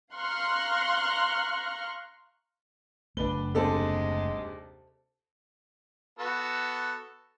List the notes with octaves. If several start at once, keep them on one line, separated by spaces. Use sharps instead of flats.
F5 A#5 C6 C#6 F6 F#6
F#1 A3 D4 B4 G7
D#2 C3 G#3 D4 A4 C5
B3 F#4 A4